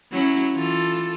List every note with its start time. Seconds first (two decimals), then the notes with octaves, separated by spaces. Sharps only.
0.12 F#3 C#4 E4
0.54 E3 F4 A4